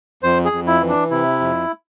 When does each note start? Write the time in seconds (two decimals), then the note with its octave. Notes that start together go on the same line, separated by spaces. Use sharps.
0.23 F2 C5
0.45 G#4
0.52 F2
0.67 E4
0.81 E3
0.89 D4
1.10 C3 E4
1.40 F2